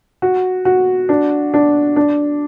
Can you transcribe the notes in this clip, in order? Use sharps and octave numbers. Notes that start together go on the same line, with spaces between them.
F#4
F#4
D4
D4
D4